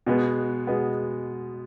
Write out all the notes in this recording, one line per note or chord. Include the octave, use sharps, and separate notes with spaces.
B2 G#3 B3
B2 G#3 B3